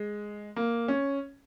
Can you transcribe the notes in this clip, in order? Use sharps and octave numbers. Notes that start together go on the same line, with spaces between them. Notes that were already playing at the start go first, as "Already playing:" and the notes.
Already playing: G#3
A#3
C#4